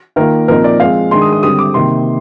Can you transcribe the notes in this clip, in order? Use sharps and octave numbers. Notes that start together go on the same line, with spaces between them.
D#3 A#3 F4 A#4
A#2 F3 C4 D#4 A#4
D5
F3 G#3 C4 F4 F5
D#3 G#3 D4 C6
D#6
D#6
D3 G3 C4 D#6
D6
C3 D#3 A#3 C6